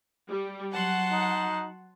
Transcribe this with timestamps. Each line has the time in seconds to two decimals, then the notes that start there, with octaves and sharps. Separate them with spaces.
0.29 G3
0.73 F#3 F#5 A5 C6
1.11 D#4